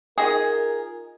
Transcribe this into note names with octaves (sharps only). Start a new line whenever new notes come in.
D#4 F4 G#4 A#4 D#5 G#5